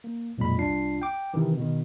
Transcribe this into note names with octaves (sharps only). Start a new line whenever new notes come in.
A#3
B1 F2 A#2 G#3 B5
C2 D4 F4 C7
G5 D6
C3 D#3 E3
B2 D#3